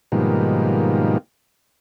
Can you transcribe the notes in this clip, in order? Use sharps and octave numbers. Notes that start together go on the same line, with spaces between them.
G#2 B2 D#3 F3 G3 A#3